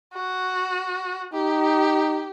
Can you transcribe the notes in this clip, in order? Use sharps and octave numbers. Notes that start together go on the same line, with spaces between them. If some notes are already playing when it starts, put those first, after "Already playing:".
F#4
D#4 G4